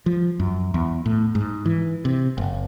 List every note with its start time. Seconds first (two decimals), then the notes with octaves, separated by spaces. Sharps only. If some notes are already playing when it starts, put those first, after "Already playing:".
0.06 F3
0.40 F#2
0.74 E2
1.06 A2
1.35 G#2
1.66 E3
2.05 C3
2.38 F#1